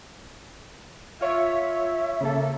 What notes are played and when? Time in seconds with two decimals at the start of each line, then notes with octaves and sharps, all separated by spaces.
1.21 F4 C#5 E5
2.21 C#3 A#3 A4